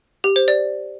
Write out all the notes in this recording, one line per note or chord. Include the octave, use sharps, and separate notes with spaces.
G4
C5
D5